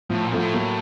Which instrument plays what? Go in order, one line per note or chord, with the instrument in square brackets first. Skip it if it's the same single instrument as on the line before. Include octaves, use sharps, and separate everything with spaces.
[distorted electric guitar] A2 [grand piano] F3
[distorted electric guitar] A#2
[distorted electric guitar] F#2 [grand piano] F3 A3
[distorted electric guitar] A2
[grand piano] F#3 A#3